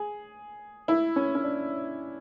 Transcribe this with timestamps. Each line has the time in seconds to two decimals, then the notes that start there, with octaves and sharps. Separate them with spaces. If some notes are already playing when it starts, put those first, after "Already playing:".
Already playing: G#4
0.88 E4
1.16 C#4
1.35 C#4
1.43 D4